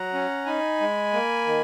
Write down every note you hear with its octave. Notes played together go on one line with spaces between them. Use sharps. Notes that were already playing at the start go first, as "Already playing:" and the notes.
Already playing: F#3 F#5 A#5
C#4
D#4 G#5 B5
G#3
A#3
D#3